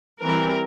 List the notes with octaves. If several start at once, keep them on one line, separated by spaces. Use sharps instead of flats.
E3 G3 C4 A#4